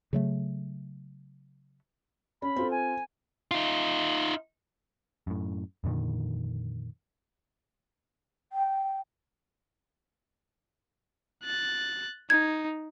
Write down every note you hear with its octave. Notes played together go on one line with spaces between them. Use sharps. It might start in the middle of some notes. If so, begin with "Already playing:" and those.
C#3 F#3 A3
C#4 B5
C4 F4 A4
G#5
D#4 F4
F#2 A2
F2 A#2 D3 D#3
G5
F#6 A6
D#4 G#6